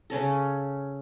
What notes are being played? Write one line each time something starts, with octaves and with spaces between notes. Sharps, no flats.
C#3 C#4 A4